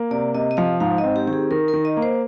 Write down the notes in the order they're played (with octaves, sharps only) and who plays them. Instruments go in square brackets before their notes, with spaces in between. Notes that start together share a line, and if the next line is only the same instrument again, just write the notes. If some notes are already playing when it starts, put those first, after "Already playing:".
Already playing: [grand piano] A#3
[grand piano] C3 [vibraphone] D5
[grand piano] C3 [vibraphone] D#5
[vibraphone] D#5
[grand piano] F3 [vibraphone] F5
[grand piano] G#2 [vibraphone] F5
[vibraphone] D#5
[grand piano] C4
[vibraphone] G4
[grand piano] D#3 [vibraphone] G4
[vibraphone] G#4
[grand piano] D#3 [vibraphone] A#4
[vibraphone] A#4
[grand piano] D#3
[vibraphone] D#5
[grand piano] A#3
[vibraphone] C5